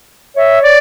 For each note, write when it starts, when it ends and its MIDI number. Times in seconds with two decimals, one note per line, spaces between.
0.36 0.78 73
0.36 0.61 76
0.62 0.78 74